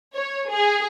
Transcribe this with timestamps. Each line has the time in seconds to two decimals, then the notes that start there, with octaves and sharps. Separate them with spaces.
0.14 C#5
0.50 G#4